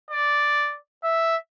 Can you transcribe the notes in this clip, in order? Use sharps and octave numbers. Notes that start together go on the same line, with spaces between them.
D5
E5